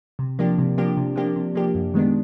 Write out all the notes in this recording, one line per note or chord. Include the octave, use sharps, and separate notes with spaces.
C3
F3 A#3 D4 G4
C3
F3 A#3 D4 G4
C3
F3 A#3 D4 G4
C3
F3 A#3 D4 G4
F#2
D#3 G#3 B3 D4